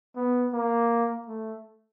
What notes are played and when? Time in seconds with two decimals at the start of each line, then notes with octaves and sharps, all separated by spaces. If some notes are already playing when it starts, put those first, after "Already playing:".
0.16 B3
0.53 A#3
1.27 A3